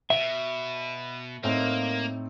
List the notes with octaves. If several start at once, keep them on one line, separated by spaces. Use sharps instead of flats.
B2 E5
A2 A#3 C4 D#4